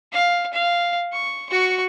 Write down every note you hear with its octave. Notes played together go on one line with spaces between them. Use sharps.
F5
F5
C#6
F#4 C#6